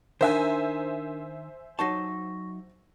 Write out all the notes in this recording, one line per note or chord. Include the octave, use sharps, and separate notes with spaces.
D#3 D4 A#4 C5 E5 G#5
F#3 D#4 A5 C#6 A#6